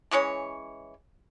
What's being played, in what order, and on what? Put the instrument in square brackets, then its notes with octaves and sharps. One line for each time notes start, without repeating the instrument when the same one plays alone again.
[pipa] E3 G#3 C#4 C#5